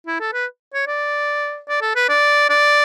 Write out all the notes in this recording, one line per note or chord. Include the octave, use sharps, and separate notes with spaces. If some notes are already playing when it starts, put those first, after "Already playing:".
E4
A4
B4
C#5
D5
D5
A4
B4
D5
D5